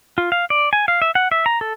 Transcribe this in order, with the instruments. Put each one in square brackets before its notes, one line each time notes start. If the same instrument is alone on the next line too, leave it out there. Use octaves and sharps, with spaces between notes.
[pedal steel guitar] F4
F5
D5
G#5
F5
E5
F#5
E5
A#5
A4